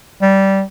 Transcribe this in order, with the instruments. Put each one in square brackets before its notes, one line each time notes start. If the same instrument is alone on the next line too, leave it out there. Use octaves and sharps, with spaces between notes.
[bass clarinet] G3